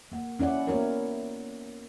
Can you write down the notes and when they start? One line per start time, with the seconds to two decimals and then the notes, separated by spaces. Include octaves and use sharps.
0.12 A#3 F#5
0.39 C#4 E4 D5 F#5
0.67 A#3 B3 E4 F#4 A#4 C#5